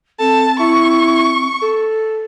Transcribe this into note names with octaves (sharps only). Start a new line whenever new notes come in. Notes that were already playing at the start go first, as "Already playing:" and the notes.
C4 A4 A5
E4 C#6
A4